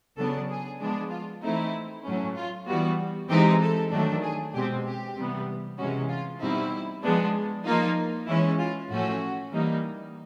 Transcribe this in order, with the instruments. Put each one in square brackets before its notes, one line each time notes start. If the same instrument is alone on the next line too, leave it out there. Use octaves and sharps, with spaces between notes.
[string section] C#3 F#3 B3 D4 A4
G#4
F3 G#3 B3 D4
F4
E3 A3 C4 D#4 E4
A2 F#3 A3 C#4
F4
E3 G3 B3 F#4
E3 G#3 C4 D#4 G4
A4
D#3 F#3 A3 D4
G#4
B2 G#3 C4 G4
G4
C3 E3 G3 B3
C3 E3 G#3 C#4 F#4
F4
B2 G3 C4 D#4 E4
F3 G#3 B3 D4
F3 A#3 D#4 F4
E3 G#3 C#4 E4
F4
A2 F3 A3 C#4 F#4
E3 G3 A#3 D#4